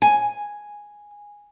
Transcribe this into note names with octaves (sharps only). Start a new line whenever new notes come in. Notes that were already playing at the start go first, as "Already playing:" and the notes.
G#5